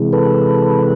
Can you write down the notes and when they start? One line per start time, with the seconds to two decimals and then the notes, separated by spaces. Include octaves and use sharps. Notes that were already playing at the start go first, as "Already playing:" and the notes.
Already playing: C3 E3 G#3
0.13 A4 B4